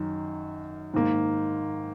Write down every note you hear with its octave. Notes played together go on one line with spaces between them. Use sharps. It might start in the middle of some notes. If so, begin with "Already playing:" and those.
Already playing: F#2 D#3
G#2 D#3 A#3